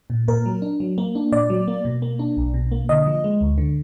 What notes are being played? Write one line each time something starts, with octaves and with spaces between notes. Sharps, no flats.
A#2
A#2 A#4
F#3
D4
F#3
A#3
D4
A#2 D5
F#3
A#3
B2
A#3
D4
B1
B2
A#3
D3 D#5
F3
G#3
D2
D3